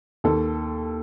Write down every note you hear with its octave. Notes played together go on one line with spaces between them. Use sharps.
D#2 A4